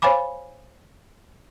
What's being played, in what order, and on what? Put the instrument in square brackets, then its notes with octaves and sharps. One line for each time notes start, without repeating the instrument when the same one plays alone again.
[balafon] C5 C#5 F5 G#5 B5 D6